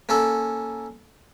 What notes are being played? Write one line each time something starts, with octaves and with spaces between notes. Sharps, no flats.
A#3 C#4 A4